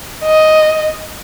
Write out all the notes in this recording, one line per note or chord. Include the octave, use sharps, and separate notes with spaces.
D#5